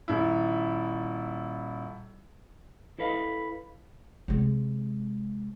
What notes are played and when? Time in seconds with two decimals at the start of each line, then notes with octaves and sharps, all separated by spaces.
0.08 D#1 E4
2.98 E4 A4 B4 D#5 F5
4.28 C3 G#3